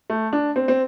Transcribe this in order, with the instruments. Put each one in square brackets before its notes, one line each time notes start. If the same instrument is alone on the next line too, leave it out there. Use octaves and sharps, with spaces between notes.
[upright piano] A3
D4
C4
C4